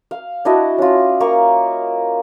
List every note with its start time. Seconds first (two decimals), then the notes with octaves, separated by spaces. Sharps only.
0.11 F5
0.45 D4 E4 F#4 D#5
0.78 C#4 F4
1.20 A#3 A#5 C#6